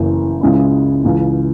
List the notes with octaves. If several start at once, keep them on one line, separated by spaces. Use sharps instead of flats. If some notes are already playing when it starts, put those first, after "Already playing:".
Already playing: F#1 F#2 E3
C#2 C#3 G#3 C#4 E4
C#2 C#3 E3